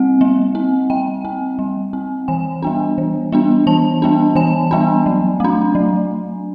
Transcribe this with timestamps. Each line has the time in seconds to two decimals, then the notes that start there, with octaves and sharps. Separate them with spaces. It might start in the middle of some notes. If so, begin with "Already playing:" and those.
Already playing: G3 C4 F#5
0.21 G3
0.55 C4
0.90 G3 G5
1.25 C4
1.59 G3
1.93 C4
2.28 E3 G#5
2.62 G3 B3 D4
2.98 E3
3.32 G3 B3 D4
3.67 E3 A5
4.02 G3 B3 D4
4.36 E3 G#5
4.71 G3 B3 D4
5.06 F#3
5.40 A3 D4
5.75 F#3